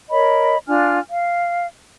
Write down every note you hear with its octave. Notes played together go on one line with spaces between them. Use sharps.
A#4 C#5 D#5 B5
D4 F4 G#5 F6
F5